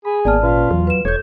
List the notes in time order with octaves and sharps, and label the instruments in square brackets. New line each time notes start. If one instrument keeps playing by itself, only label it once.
[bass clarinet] G#4 [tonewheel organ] B5
[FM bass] G#1 [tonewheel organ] A#3 B3 [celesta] D5 A5 F6
[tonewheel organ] A#2 C#4 B4 [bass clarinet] F4
[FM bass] E2 [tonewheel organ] F#3
[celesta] B4 E7
[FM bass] E1 [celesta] A4 G6 [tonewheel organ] C#5 G#6